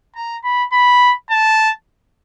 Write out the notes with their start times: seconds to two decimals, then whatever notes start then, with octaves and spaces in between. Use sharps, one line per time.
0.16 A#5
0.44 B5
0.72 B5
1.30 A5